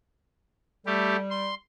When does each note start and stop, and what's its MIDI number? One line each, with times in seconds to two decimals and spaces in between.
0.86 1.51 55
0.86 1.16 57
0.86 1.16 67
1.30 1.54 84